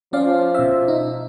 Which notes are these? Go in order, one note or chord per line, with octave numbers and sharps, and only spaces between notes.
F3 C#4 D5 F5
B2 E5
D#4